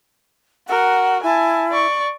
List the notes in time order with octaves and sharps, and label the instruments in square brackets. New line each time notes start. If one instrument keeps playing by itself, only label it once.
[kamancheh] F#4 A#4 [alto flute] F#5
[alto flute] E4 [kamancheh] G#5 A5
[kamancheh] D5 C#6